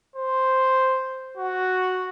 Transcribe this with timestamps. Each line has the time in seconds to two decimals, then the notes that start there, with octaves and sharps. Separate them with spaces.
0.16 C5
1.37 F#4